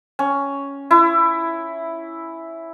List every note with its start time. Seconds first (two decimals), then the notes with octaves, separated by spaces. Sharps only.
0.19 C#4
0.91 E4